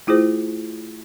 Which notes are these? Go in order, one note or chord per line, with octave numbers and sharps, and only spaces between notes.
A3 E4 F4 G#4 C5